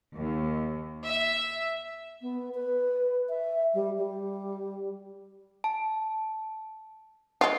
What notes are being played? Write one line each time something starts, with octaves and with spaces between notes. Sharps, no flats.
D#2
E5
B3
B4
E5
G3
G3
A5
G#3 F4 C7